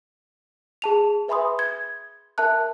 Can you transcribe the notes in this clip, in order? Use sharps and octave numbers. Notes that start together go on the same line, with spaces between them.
G#4 A5 F7
B4 E5 G#5 B5 C6 D#6
G#6
A#4 E5 A5 F#6